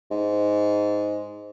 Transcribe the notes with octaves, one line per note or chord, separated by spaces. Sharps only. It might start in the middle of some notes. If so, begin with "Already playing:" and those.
G#2